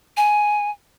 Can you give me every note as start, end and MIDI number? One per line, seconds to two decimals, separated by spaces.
0.17 0.71 80